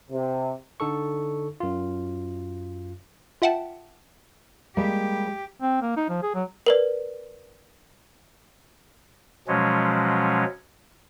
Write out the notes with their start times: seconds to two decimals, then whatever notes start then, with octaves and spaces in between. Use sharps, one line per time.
0.10 C3
0.80 D3 D#4 A4 C#6
1.60 F#2 F4
3.42 F4 E5 F#5 G5 A5
4.77 G3 G#3 A#3 G4
5.62 C4
5.82 A#3
5.97 D#4
6.09 F3
6.22 G#4
6.35 F#3
6.66 A#4 B4 D5
9.48 B2 F3 F#3 G#3 C#4